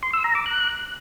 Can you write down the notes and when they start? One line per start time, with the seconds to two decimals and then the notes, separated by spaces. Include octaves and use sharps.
0.03 C6
0.13 E6
0.24 A#5
0.35 D6
0.46 F#6